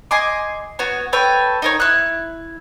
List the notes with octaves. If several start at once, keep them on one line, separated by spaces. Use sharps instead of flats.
D#5 G#5 C6 D6
B3 F#4 C#5
A4 B4 C#5 G5
D#4 A#4 C#5
E4 F#6